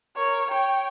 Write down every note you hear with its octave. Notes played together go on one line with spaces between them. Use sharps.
A#4 C#5
C#5 G5